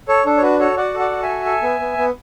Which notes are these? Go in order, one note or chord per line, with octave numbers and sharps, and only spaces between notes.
A4 C#5
D4 A4
C#5
F#4 B4
F#4 A4 C#5
F#4 D5 F#5
A4
D5 F#5
F#4
E5 G#5
A4
A4
B3
B3
B3